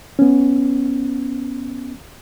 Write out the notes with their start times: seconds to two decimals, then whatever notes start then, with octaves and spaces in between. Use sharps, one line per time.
0.19 B3 C#4